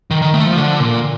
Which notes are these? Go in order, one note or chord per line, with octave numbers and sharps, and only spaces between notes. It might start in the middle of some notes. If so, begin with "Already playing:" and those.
D#3
D#3
A3
F3
D3
A#2